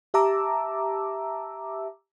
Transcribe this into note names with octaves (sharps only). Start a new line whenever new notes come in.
G4 E5 A5 A#5 D6 E6